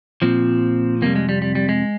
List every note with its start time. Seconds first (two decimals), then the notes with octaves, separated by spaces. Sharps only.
0.22 A#2 F3 C4
1.02 F2 C3 G3 A#3
1.16 G#3
1.29 G3
1.42 G3
1.55 G3
1.69 G#3